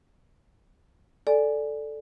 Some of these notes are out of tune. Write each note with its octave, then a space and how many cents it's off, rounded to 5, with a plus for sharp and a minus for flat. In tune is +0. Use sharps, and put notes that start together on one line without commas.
A4 +0 D5 +0 G#5 +0